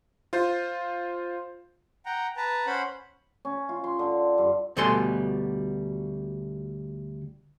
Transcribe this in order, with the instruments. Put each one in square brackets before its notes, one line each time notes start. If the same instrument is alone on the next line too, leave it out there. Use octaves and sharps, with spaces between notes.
[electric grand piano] F4 C5
[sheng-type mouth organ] F#5 G5 A#5
B4 A5 A#5
C#4 C5 F#5 B5
[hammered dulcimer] C#4
F4
C6
D3
G2
[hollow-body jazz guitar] D2 B2 G3 A4 G#5 C6